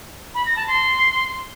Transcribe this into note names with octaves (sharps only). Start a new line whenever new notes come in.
B5
A#6
A5
C6